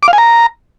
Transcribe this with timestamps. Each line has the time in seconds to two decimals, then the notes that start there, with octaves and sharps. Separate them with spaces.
0.03 D6
0.08 F5
0.13 G#5
0.18 A#5